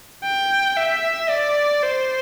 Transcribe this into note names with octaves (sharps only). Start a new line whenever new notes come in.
G5
E5
D5
C5